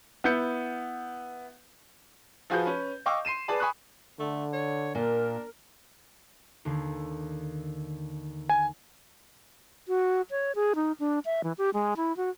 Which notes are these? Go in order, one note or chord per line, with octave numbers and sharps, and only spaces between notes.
B3 E4 G6 C#7
F3 F4 F#4 G#4 B4 G6
C#4 B4
D#5 F5 G5 C#6 D6 E6
C6 C7 D#7 E7
G#4 B4 D5 A5 B5
G#5 B5 C#6 D#6 F#6
D3 A3
C#5
A#2 D4 A#4
D#2 D3
G#5
F#4
C#5
G#4
D#4
D4
E5
E3
G4
G#3
E4
F#4